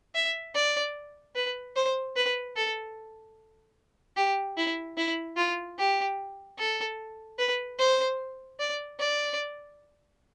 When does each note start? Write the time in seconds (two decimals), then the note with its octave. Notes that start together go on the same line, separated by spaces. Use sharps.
0.15 E5
0.55 D5
1.36 B4
1.76 C5
2.16 B4
2.56 A4
4.16 G4
4.57 E4
4.97 E4
5.37 F4
5.78 G4
6.58 A4
7.38 B4
7.79 C5
8.59 D5
8.99 D5